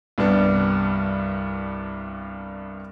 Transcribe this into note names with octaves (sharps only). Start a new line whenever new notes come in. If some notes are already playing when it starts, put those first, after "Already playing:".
C2 G2 G3 B3 D4